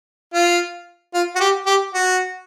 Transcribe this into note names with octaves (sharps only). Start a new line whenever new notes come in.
F4
F4
F#4
G4
G4
F#4